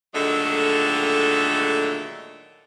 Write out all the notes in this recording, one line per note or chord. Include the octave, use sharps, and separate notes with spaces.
A#2 D3 D#3 F#3 G#3 A3